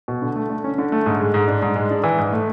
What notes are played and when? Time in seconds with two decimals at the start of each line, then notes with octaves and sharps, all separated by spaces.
0.08 B2
0.22 D3
0.35 A3
0.50 D3
0.64 C#4
0.78 D3
0.92 A3
1.06 G#2
1.20 G#3
1.34 G#2
1.48 D4
1.62 G#2
1.76 G#3
1.91 D4
2.04 E3
2.18 G#2
2.32 A3